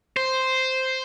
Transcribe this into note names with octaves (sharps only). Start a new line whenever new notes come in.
C5